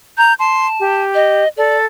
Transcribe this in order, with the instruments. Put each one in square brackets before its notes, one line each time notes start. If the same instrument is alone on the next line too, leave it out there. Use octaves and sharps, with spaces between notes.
[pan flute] A#5 [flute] G6
[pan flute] A5 [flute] C6
[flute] G4
[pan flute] D#5
[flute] A4 [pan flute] D5